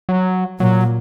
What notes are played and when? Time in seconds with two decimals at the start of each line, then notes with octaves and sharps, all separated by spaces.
0.09 F#3
0.60 A#2 F#3